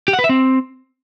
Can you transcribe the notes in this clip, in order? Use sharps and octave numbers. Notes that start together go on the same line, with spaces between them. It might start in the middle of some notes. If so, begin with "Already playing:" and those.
G4
F#5
B4
E5
C4